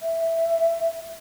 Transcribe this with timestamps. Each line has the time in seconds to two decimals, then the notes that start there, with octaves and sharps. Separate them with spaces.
0.02 E5